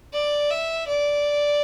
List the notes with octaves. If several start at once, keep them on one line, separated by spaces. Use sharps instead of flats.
D5
E5
D5